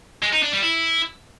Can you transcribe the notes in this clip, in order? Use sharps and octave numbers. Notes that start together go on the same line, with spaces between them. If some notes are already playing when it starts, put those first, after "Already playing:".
G#3
D#4
D4
G3
E4